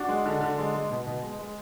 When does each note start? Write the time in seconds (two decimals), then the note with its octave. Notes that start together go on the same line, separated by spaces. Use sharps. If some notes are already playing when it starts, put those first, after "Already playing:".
Already playing: D4 F#4
0.09 G#3
0.25 D3
0.41 D3
0.58 G#3
0.74 G#3
0.91 B2
1.07 B2
1.23 G#3
1.39 G#3